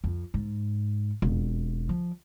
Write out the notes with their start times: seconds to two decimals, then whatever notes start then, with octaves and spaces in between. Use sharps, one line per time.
0.04 F2
0.34 G#2
1.22 E1 F2
1.89 F3